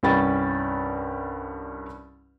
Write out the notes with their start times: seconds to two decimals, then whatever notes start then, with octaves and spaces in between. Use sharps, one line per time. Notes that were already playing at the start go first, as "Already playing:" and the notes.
0.03 C2 G2 C#4 G5 B5 A6